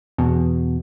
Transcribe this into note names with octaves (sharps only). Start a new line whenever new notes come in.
E2 B2